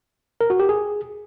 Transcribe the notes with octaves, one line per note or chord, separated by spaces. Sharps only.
A#4
F#4
G4
G#4